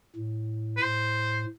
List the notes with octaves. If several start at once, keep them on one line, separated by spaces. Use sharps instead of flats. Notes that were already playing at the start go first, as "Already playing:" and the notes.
A2
B4
A2 C5